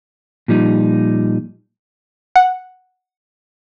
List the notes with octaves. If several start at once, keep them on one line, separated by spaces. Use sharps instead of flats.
A#2 F3 G3 D#4
F#5